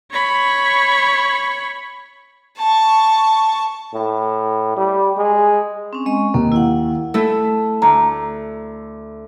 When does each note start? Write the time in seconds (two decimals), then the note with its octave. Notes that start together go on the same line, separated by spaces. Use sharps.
0.12 C#5 B5
2.57 A5 C#6
3.94 A2
4.77 G3
5.17 G#3
5.93 C4 C#4
6.06 G#3 D#5 C#6
6.34 D#2 A#3
6.52 E4 F5 F#5
7.14 A3 E4 A4
7.82 D2 A#5